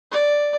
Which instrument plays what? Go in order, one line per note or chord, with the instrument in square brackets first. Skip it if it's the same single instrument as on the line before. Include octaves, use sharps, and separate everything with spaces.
[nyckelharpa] D5